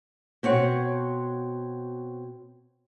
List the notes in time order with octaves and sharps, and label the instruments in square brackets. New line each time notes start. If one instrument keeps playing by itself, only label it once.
[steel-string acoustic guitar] B2 C4 C#5 F#5